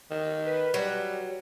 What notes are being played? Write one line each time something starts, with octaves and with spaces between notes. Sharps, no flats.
D#3
B4
F#3 G3